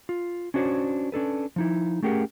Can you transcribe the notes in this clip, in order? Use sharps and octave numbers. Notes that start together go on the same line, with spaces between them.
F4
C#4 D4 F#4 C5 C#5
C#4 D4 A4 B4
F3 D#4 E4
A3 C#4 G4 G#4 A#4 F#5